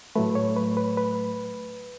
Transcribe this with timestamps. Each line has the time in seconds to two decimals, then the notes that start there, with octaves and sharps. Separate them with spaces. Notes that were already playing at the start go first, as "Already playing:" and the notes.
0.16 A2 F#3 A3 B4
0.35 C#5
0.56 B4
0.77 B4
0.97 B4